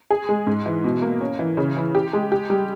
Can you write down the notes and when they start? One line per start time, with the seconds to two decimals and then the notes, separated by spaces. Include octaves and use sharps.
0.10 G#4
0.29 G#3
0.47 G#2
0.66 E3
0.84 B2
1.02 A#3
1.21 C#4
1.39 E3
1.57 C#3
1.77 E3
1.95 G4
2.13 G#3
2.32 G4
2.50 G3